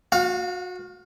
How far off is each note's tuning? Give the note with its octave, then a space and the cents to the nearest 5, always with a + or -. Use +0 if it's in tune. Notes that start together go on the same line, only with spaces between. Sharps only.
F#4 -30 F5 +20